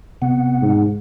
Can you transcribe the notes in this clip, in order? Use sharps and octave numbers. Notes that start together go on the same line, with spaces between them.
C3 B3 F#5
G#2